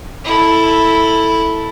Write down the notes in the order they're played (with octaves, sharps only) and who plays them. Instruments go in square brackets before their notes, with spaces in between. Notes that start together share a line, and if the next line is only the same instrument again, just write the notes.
[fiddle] E4 A4